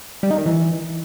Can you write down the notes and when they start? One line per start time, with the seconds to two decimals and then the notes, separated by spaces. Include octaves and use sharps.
0.23 G3
0.31 D#4
0.38 D#3
0.46 E3